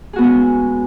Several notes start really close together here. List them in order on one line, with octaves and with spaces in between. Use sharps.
G#4 F#4 B3 C#4 G#3